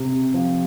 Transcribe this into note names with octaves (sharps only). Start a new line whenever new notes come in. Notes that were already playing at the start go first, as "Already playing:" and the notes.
Already playing: C3
F3